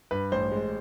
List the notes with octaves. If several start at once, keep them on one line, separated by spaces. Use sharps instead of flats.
G2 B4
A1 C5
G#3